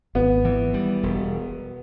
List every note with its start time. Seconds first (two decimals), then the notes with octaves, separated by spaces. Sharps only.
0.15 G#1 B3
0.45 E3
0.74 G3
1.03 E1